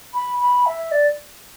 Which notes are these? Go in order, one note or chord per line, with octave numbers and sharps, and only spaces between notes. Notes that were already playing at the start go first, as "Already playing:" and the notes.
B5
B5
E5
D5